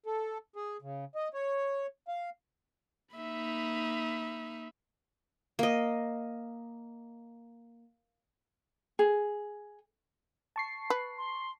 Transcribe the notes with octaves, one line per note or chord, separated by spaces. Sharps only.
A4
G#4
C#3
D#5
C#5
F5
A#3 D#4 E5 B5
A#3 D#5
G#4
A5 C#6 C7
B4
C6